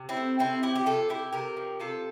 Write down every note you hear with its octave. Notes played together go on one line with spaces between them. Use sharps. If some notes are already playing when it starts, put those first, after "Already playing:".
Already playing: C3
C4 E4
A3
C3 C4 E4
F3 E4 G4
G4
C3 F4 A4
A3 E4 G4
C3 G4 A#4
F3
C3 F4 A4